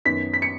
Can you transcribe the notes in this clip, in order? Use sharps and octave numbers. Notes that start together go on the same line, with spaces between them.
F#2 D#3 B3 B6
B6
C#7